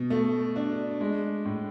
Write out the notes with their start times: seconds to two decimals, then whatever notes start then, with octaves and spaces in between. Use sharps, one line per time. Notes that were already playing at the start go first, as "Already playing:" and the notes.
Already playing: B2
0.10 A3
0.56 D4
1.01 G#3
1.45 A2